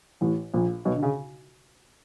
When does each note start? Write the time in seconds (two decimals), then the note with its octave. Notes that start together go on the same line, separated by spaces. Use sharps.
0.21 A1 A2
0.54 A#1 A#2
0.85 B1 B2
0.96 D3
1.03 C#3